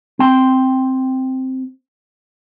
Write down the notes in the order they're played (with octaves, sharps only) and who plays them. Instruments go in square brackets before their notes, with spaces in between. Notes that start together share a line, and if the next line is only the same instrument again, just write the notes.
[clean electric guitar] C4 G5